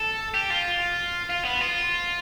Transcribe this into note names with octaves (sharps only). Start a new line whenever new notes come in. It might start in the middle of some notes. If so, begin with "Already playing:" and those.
Already playing: A4
G4
F4
F4
B3
F4